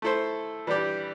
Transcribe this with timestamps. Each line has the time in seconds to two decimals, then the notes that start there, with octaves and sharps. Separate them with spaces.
0.02 A3 E4 A4 C5
0.67 E3 G3 D4 G4 D5